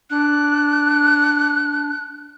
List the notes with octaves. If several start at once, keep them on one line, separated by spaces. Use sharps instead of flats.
D4 F#6